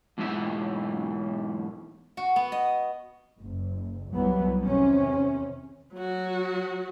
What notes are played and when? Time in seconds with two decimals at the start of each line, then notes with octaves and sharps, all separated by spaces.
0.18 E2 G#2 B2 E4 E5
2.17 F#4
2.36 B3
2.52 D#5
3.38 F#1
4.12 C2 E3 F#3 G3 B3
4.64 E2 C3 D#3 C#4
5.94 F#3 F#4